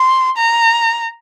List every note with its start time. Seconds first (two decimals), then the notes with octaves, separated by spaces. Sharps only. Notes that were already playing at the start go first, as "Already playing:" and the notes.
Already playing: C6
0.37 A#5